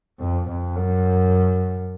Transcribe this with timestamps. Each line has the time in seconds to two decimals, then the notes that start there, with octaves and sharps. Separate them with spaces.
0.20 F2
0.49 F2
0.76 F#2